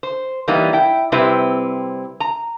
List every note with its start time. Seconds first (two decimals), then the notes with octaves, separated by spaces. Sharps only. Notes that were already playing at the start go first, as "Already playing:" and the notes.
0.03 C5
0.48 E3 G3 A#3 B3 D#4
0.73 E4 G5
1.12 C3 G3 C4 E4 G4 B4
2.20 A#5